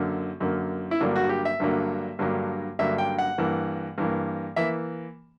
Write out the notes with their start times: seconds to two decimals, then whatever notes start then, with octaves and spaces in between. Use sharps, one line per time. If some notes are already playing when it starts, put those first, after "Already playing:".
Already playing: F#2 D3 A#3
0.40 F#2 D3 A#3
0.91 E4
1.00 G2 D3 F#3 A#3 D4
1.16 F#4
1.29 G4
1.45 E5
1.60 G2 D3 F#3 A#3
2.19 G2 D3 F#3 A#3
2.79 G2 D3 F#3 A#3 E5
2.98 G5
3.18 F#5
3.38 G2 E3 A#3
3.98 G2 E3 A#3
4.56 E3 A#3 E5